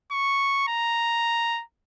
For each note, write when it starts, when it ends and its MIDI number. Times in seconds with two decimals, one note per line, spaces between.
0.12 0.65 85
0.68 1.63 82